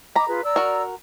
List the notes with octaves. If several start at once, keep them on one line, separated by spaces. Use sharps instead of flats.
D#5 A#5 B5 D6
F4 G#4 B4
D5 A#5 E6
F#4 A#4